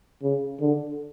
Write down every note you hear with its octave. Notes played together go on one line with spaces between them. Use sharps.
C#3
D3